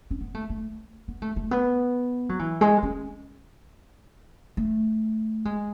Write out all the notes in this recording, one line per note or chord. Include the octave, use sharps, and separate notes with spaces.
C#4
B3
A3
A3
B3
A3
A3
B3
F#3
E3
G#3
C#4
A3
G#3